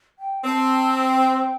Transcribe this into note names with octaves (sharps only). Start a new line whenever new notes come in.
G5
C4 A5
G5